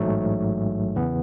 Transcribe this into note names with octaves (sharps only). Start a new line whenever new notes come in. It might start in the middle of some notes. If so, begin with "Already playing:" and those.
Already playing: A1 G#2 F#3 A3
E2 C#3 E3 B3